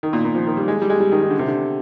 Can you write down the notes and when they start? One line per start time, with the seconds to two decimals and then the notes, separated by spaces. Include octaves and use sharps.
0.03 D#3
0.13 A#2
0.25 A#2
0.35 F3
0.47 D#3
0.57 G3
0.68 G#3
0.82 G3
0.90 G#3
1.00 G3
1.12 D#3
1.22 D#3
1.30 D3
1.39 C3
1.48 D3